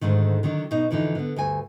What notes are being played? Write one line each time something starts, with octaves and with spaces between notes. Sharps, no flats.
D2 G#2 D3 D#3
D3 D#3 F#3 D4
B2 D#4
F2 D3 E3 D#4
D3 B3
D2 G2 G#5